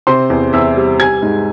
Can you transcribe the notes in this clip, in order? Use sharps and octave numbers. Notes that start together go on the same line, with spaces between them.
C3 C5 C6
E2
E2 E5 E6
G3
G3 G#5 G#6
G#2